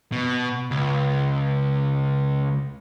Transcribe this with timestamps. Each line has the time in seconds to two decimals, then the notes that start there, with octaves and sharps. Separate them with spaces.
0.12 B2
0.71 C#2